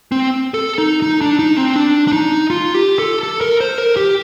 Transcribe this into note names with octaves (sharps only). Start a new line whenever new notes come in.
C4
A4
D#4
D#4
D4
D#4
C4
D4
D4
D#4
F4
G4
A4
A4
A#4
C5
A#4
G4